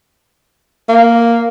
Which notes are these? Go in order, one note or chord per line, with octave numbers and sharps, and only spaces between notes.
A#3